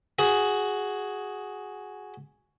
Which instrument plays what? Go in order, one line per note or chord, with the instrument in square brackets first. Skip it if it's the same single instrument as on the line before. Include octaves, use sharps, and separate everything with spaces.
[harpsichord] F#4 G#4